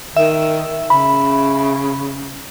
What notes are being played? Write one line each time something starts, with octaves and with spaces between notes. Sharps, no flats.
D#3 E5
C#3 B5